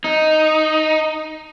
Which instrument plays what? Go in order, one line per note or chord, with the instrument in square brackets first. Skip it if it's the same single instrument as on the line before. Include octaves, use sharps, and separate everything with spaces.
[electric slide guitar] D#4